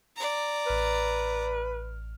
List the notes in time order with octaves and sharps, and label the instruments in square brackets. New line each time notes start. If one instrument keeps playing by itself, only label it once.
[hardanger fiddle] D5 A#5
[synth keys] A1 F6 [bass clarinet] B4